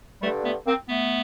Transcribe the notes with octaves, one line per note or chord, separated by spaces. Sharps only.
G2 D3 G3 A3
A3 B3
A#3 C4
A3 B3